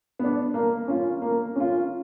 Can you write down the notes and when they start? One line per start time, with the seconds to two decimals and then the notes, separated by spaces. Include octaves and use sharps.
0.19 B3 D4
0.54 A#3
0.88 C#4 F4
1.22 A#3
1.56 C#4 F4